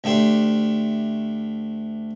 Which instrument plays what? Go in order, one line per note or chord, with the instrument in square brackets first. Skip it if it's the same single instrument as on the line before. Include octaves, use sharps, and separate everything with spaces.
[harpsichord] D2 A3 D4 G4 C6